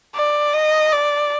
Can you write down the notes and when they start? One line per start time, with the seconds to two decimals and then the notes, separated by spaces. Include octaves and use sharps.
0.15 D5
0.54 D#5
0.92 D5